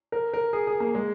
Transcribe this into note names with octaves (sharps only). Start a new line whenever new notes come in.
A#4
A#4
G#4
G#4
A#3
G#3